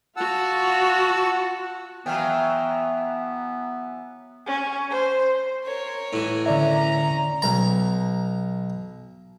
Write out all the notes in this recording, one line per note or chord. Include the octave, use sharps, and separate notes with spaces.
F4 F#4 F#5 A5 E6
E3 F#3 B3 F5 G5 G#5 A#5
C#4
C5
A#4 C#5
A2 E3
D3 C#4 D5 E5 A#5
B1 A#5